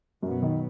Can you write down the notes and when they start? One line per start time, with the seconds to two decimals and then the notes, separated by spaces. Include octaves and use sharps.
0.23 F#2 B2 F#3 B3
0.42 D#3